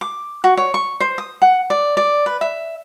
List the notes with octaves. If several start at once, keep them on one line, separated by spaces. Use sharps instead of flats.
D6
F#4
C#5
C#6
C5
D#6
F#5
D5
D5
B4
E5